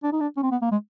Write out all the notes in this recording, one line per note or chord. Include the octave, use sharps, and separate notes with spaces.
D4
D#4
D4
C#4
C4
B3
A#3
G#3